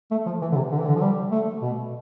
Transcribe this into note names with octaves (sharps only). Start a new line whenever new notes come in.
A3
F3
E3
D3
C3
D3
E3
D3
F3
G3
A3
B2